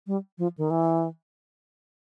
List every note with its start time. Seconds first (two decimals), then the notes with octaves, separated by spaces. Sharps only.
0.07 G3
0.38 F3
0.58 D#3
0.70 E3